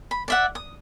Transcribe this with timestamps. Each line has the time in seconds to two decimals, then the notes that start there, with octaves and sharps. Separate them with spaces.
0.11 B5
0.28 D5 E5 F#5
0.55 D#6